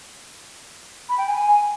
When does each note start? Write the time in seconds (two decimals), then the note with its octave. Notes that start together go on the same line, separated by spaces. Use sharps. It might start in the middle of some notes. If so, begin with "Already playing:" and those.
1.09 B5
1.18 G5
1.27 G#5